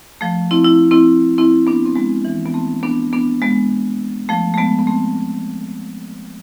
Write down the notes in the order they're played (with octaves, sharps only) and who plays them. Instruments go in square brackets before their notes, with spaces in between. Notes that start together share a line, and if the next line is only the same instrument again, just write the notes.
[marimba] F3 A3
C4 E4
E4
C4 E4
C4 E4
B3 D4
C4
G#3 B3
E3
B3
A3 C4
B3 D4
B3 D4
G#3 B3
F3 A3
A3
G#3 B3
B3
A3 C4